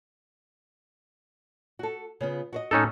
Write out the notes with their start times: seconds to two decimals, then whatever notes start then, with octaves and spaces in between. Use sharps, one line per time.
1.79 F#4 A4
2.20 C#3 B3 F4
2.53 F#4 C5 D#5
2.71 A2 C#4 D#4 F#4 A4